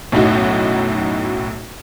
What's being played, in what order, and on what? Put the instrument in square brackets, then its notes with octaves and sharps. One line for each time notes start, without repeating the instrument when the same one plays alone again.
[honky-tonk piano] B1 F#2 A2 D#4 F#4